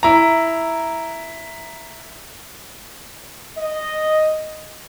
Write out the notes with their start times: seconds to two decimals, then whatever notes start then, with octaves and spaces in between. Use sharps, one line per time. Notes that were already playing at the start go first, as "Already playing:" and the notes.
0.03 E4 A#5
3.57 D#5